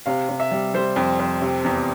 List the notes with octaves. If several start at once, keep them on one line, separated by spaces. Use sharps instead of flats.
C3 F5
C3
E5
G3
G3 C5
F2
F2
C3
E2